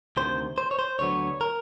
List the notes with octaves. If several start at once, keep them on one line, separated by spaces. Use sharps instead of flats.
D2 C3 D#3 C5
C5
C#5
C5
D2 D3 F#3 B3 C#5
A#4